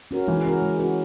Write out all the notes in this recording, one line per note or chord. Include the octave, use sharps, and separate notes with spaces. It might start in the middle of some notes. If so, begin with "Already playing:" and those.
C#4 F#4 A#4
E3 G#3
C#4 F#4 A#4
G#3
C#4 F#4 A#4